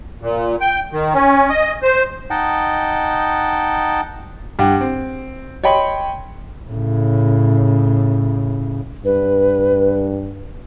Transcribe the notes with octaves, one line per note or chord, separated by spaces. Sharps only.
A#2
G5
D#3
C#4
D#5
C5
D#4 D#5 F#5 G5 A5
G2 F#5 G5
C4
C#5 D#5 G5 B5 C6
A2 C#3
G2 B4